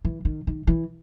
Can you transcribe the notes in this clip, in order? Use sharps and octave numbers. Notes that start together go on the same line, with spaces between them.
E3
D#3
D#3
E3